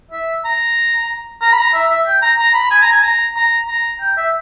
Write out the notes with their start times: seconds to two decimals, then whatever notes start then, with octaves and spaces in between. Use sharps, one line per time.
0.11 E5
0.45 A#5
1.42 A#5
1.52 B5
1.58 A#5
1.73 E5
1.90 E5
2.07 G5
2.22 A#5
2.39 A#5
2.54 B5
2.71 G#5
2.82 A#5
2.92 G#5
3.03 A#5
3.36 A#5
3.68 A#5
4.01 G5
4.17 E5